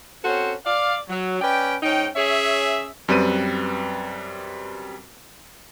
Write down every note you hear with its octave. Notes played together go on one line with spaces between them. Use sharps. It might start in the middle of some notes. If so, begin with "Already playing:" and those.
C4 C#4 F#4 A4 C5
D5 F5
F#3
C#4 B4 D5 G5
G#2 C#4 D#4 G5
C#4 G#4 C#5 E5
F#2 G3 C4 B4 D#7